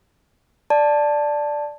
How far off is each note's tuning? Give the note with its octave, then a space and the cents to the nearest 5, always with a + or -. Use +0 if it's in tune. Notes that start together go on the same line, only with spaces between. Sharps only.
D5 +0 A5 +0